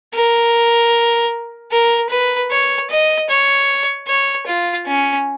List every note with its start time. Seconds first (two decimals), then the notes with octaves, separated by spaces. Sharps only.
0.14 A#4
1.72 A#4
2.10 B4
2.51 C#5
2.90 D#5
3.30 C#5
4.07 C#5
4.47 F4
4.87 C#4